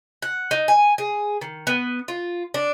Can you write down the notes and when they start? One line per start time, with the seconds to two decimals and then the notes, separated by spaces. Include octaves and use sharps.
0.22 F#5
0.51 D#4
0.68 G#5
0.98 G#4
1.41 D#3
1.67 B3
2.08 F4
2.54 D4